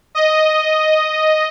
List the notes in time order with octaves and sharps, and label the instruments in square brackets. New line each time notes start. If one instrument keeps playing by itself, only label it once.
[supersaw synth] D#5